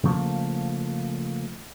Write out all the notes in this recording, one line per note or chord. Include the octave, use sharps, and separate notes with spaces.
C#3 F3 A3 A#3